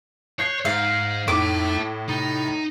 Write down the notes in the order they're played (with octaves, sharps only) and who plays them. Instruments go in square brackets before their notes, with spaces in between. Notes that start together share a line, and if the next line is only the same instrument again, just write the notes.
[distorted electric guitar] C#5 [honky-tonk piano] F#6 G6 C7
[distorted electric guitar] G#2 [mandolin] F5
[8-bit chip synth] F2 A#3 D#4 [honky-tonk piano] A2 [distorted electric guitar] E5 A5 [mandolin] D6
[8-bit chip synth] C3 B5 A6 [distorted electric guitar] D#4